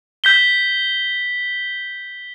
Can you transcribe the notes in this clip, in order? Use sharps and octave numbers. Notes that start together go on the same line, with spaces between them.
G6 B6 G7